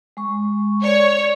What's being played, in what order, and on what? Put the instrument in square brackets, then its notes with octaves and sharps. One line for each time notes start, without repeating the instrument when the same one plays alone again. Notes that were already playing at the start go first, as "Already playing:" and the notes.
[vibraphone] G#3 C#6
[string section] C#5 [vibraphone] D5